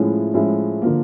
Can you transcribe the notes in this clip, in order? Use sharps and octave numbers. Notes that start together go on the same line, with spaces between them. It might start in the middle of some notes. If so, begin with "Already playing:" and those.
Already playing: A2 F3 G#3 C#4 E4
A2 F3 G#3 C#4 E4
D3 F3 A#3